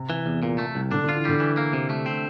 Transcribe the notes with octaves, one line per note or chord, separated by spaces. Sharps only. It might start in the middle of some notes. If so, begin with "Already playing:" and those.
Already playing: C3
E3
E2
A#2
A3
C2
D3 D4
D3 F4
E3
D3 G3
E3
A#3
C3
A3
C4